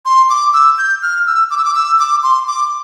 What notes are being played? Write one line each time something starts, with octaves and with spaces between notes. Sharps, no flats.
C6
D6
E6
G6
F6
E6
D6
E6
D6
E6
D6
C6
D6